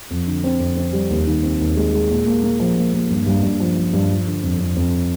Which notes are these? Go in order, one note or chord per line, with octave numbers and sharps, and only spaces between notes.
F2
D3
C4
F2
C4
G3
D#2
D#3
C4
D#2
G#3
G#3
A#2
A#3
A#3
F3
A#3
A#3
G2
G2
G2
F3
F3
G2
F3
D3
F2
F2
F2